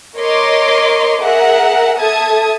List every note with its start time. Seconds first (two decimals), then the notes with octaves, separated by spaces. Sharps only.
0.17 A#4 C#5 D#5 C6 D6
1.22 G#4 A#4 E5 F#5
1.97 A4 E5 A5 D#6 G#6